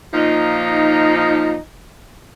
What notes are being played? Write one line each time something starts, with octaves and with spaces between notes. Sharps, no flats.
A#2 F3 D#4